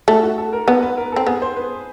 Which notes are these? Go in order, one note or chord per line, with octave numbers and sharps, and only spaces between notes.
A3 F#4
F#4
A4
A#4
B3 B4
B4
A#4
C4 A4
B3 G#4
C5
B4